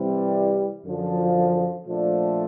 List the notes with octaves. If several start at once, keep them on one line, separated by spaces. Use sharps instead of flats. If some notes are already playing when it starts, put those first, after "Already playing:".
Already playing: C3 E3 G3 C4
F#2 D3 F3
A#2 F3 A3 D4